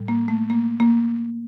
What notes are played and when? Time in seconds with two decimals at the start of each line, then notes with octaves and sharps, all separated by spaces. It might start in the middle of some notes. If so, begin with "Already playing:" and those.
Already playing: A2 G3
0.08 A#3
0.28 A3
0.50 A#3
0.80 A#3